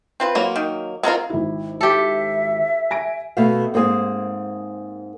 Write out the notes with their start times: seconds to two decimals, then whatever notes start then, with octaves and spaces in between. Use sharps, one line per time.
0.20 C4 F4 B4
0.35 F#3 A#3
0.56 D#3
1.03 G#3 C4 F4 F#4 A#4
1.30 G#1 E4
1.81 G4 A4 E5
2.91 G#5 A#6 D7
3.37 B2 A3 E5 F5
3.74 G#2 A#3 C4 G#4